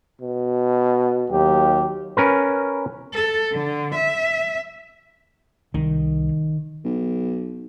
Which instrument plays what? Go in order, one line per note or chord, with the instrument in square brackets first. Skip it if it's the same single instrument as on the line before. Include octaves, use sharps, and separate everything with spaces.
[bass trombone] B2
[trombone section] D#2 F#3 G4
[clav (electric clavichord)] C#4 A#4 B4
[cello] A4
D3
E5
[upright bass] C2 [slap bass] D#3
[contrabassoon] B1